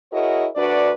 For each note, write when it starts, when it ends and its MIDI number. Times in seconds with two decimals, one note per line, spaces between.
0.12 0.47 64
0.12 0.47 66
0.12 0.47 68
0.12 0.47 70
0.12 0.47 73
0.12 0.47 75
0.56 0.91 38
0.56 0.91 62
0.56 0.91 66
0.56 0.91 71
0.56 0.91 74